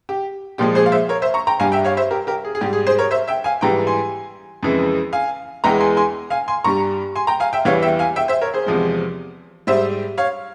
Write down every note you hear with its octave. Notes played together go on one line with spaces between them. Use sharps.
G4
A#2 F3 G#3 G4
G#4 C5
F5
C5 E5
A#4 C#5
C5 E5
A#5 C#6
G5 A#5
G2 G3 F5 G#5
E5 G5
C#5 F5
C5 E5
G4 A#4
G4 A#4
G#4
G#4
G#2 G3 G4
G#4
G#4 C5
A#4 C#5
C5 E5
E5 G5
F5 G#5
G#2 E3 G3 G5 A#5
G#5 C6
F2 C#3 E3 G#3
F5 G#5
E2 E3 G#3 G5 A#5
G#5 C6
G#5 C6
F5 G#5
G#5 C6
G2 G3 A#5 C#6
G#5 C6
G5 A#5
F5 G#5
E5 G5
E2 E3 G3 C#5 F5
E5 G5
F5 G#5
E5 G5
C5 E5
A#4 C#5
G#4 C5
E2 C3 F3 G#3
G#2 G3 C5 E5
C#5 F5